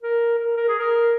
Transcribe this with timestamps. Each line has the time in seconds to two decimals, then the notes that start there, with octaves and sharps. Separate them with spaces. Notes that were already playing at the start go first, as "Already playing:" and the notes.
0.02 A#4
0.39 A#4
0.57 A#4
0.68 G#4
0.79 A#4